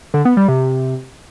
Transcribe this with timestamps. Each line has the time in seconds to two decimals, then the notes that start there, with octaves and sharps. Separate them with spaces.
0.14 D3
0.25 B3
0.37 G3
0.48 C3